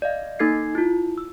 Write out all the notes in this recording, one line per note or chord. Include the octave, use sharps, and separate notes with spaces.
D5 D#5 F5
A#3 D#4 A4 G#6 C7
E4 F4
E6